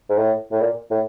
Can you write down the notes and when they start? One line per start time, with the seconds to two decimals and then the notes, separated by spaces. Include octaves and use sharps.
0.09 G#2
0.18 A2
0.52 A2
0.61 A#2
0.91 A2